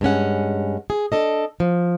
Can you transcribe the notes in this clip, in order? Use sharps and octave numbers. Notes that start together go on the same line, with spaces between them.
G2 G#3 C#4 F#5
G#4
D4 A4 D#5
F3